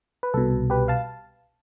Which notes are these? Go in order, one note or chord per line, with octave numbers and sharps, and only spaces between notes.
B4
C2 B2 A4
G4 B4
F5 A5